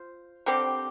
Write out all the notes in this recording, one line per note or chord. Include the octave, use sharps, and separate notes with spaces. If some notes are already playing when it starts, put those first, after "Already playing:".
Already playing: F4 C5
D3 G3 C4 G4